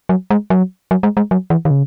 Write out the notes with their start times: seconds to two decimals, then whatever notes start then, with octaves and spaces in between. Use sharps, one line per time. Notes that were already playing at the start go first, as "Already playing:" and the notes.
0.09 F#3
0.30 G#3
0.50 F#3
0.91 F#3
1.03 G#3
1.17 G#3
1.31 F#3
1.50 E3
1.65 D#3
1.71 C#3